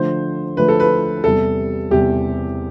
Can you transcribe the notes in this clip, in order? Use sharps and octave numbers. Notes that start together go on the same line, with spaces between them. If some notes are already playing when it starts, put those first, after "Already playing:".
Already playing: D3 F3 A3 C5
D3 F3 A3 B4
A4
B4
E2 C3 G3 A4
E2 C3 G3 G4